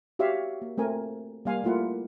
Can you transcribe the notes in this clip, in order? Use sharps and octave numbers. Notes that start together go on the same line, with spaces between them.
F#4 G4 C#5 E5 F5
A#3
A3 C4 A#4 G#5
G3 A#3 F5 G#5
A3 A#3 E4 F4 F#5